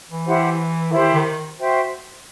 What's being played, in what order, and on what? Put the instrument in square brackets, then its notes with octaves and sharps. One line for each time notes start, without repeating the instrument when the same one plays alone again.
[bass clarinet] E3
[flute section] E4 G4 C5 F#5
[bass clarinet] D#3 [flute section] E4 G4 C5
[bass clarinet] D#3
[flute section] F#4 C5 E5 G5